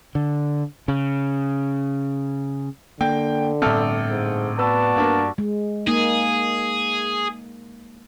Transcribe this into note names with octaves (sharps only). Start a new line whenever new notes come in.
D3
C#3
D3 A#3 G5
G1 A2 C4 A4 F6
G#2
B3 F#4 B4 D5 A5 E6
G2 A#3 D4 A#4
G#3
A#3 D#4 G#4